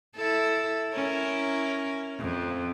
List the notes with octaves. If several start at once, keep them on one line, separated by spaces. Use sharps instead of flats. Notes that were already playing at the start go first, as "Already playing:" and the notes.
E4 A4
C#4 E4 A#4
F2